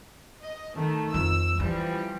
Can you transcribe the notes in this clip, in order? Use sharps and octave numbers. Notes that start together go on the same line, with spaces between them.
D#5
D#3 A3
F2 F3 E6
E3 F3 G3 C#4